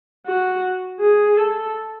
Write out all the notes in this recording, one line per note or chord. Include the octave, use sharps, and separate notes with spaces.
F#4
G#4
A4